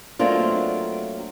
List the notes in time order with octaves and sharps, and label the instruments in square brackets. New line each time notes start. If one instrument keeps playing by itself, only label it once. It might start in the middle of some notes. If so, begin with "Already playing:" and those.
[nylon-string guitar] F#3 A3 A#3 C4 D4 F4